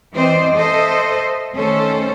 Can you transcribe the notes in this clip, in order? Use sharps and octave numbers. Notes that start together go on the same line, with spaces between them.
E3 C4 C5 D5 D#5
A4 C5 D#5 E5
D#3 A3 C#4 A4 C5